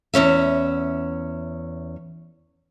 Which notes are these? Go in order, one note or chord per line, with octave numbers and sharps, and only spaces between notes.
E2 G#2 C#4 E5